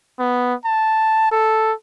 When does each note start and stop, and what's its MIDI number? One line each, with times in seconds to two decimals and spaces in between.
0.19 0.54 59
0.65 1.27 81
1.31 1.72 69